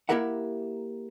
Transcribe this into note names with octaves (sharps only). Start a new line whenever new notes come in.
A#3 E4 G4 A#4 E5 F#5